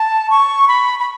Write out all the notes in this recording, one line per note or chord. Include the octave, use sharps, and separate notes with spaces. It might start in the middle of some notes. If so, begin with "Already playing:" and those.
Already playing: A5
C#6
B5
B5